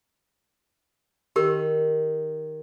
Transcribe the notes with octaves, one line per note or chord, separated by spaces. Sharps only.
D#3 G4 A#4